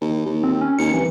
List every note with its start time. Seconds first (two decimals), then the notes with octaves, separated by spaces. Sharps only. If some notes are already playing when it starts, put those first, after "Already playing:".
0.01 D#2
0.26 D#2
0.43 C4
0.61 C#4
0.79 D#2 C#7
0.94 C2 E3